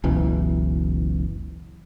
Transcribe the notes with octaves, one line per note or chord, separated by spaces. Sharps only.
F#1 C#2 B2 E3